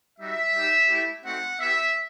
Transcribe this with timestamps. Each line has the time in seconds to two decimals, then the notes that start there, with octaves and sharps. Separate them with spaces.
0.19 G3 D#4 F#4 E5
0.54 G3 D#4 G4
0.89 A3 E4 G4
1.24 A3 C4 D#4 F#4 F#5
1.59 B3 E4 G4 E5